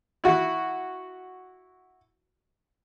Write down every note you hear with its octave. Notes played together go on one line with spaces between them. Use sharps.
E4 F#4